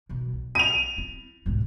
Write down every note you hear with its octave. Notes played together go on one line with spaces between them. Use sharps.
B2 D#3
B1
D#7 F7
C4 E4
B1 G#2